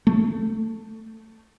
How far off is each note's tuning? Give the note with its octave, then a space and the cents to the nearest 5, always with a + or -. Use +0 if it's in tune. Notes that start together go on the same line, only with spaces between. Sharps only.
A3 +15